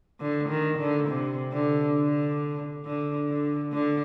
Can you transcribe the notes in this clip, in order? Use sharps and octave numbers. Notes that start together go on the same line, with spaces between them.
D3
D#3
D3
C3
D3
D3
D3
D3
D3